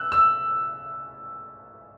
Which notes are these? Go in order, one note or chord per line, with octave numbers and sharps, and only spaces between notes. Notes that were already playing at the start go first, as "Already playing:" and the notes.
Already playing: E6 F#6
E6